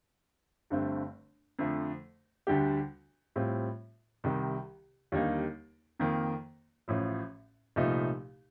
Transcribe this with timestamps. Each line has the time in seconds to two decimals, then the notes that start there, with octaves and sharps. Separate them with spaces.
0.70 G1 G2 D3 A3 C4
1.59 F2 D3 F3 A3
2.47 D2 D3 G3 D4 G4
3.36 A2 G3 C4 F4
4.24 C2 C3 D#3 G3
5.12 D#2 D3 G3 A#3 D#4
5.99 F2 D#3 A#3
6.88 A1 A2 F3
7.76 C2 A#2 F3 A3 D#4